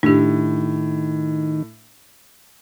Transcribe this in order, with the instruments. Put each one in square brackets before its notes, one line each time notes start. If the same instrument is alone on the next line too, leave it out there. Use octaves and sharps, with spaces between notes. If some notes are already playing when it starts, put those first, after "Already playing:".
[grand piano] A2 [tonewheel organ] D#3 [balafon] D4 G4